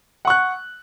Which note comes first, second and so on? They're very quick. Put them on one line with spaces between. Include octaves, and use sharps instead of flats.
F#5 C#6 F#6